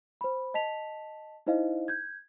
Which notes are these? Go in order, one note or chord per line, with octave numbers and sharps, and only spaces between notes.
C5 B5
D#5 A5 B6 F7
D#4 E4 C5 D#5 F5
G6 G#6